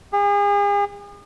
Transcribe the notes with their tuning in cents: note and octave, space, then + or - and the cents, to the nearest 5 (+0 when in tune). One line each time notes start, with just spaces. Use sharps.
G#4 -40